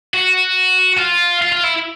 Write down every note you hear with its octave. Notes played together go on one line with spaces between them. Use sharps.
F#4
F4
F4
F4
E4